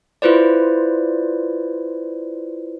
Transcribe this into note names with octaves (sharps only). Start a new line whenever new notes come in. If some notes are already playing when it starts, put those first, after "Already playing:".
E4 F4 B4 C5 D5